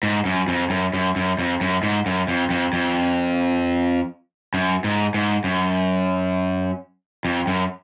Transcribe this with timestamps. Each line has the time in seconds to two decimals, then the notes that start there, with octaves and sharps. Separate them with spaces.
0.03 G#2
0.25 F#2
0.48 F2
0.70 F#2
0.94 F#2
1.16 F#2
1.39 F2
1.61 F#2
1.83 G#2
2.06 F#2
2.28 F2
2.50 F2
2.73 F2
4.54 F#2
4.84 G#2
5.14 G#2
5.44 F#2
7.25 F2
7.47 F#2